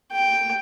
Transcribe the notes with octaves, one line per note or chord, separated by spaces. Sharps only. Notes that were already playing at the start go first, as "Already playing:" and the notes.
G5